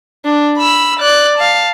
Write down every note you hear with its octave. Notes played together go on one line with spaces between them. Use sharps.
D4
B5 E6
D5 F#6
F5 A5